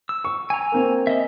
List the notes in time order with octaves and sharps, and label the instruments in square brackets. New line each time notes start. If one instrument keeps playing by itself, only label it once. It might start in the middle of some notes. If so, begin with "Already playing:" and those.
[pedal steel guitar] E6
[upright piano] C#6
[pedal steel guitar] G#5 A#5
[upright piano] A#3 C4
[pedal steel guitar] D#5 E5